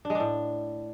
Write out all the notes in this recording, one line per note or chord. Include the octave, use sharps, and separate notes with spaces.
D4
G#3
D4
A2